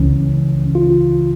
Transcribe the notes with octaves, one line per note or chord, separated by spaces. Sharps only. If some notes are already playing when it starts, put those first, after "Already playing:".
Already playing: C#2 C#3 E3 C#4
F4